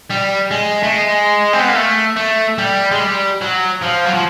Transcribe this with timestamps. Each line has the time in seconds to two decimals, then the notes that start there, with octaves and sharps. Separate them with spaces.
0.10 G3
0.51 G#3
0.83 A3
0.92 G#3
1.53 C4
1.60 B3
1.68 A#3
1.75 A3
2.16 A3
2.58 G3
2.91 G#3
3.00 G3
3.42 F#3
3.83 F3
4.06 F#3
4.14 F3